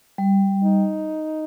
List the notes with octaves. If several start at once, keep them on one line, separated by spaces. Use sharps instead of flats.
G3
D#4